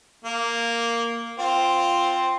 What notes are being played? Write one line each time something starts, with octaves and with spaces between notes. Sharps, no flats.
A#3
C4 F4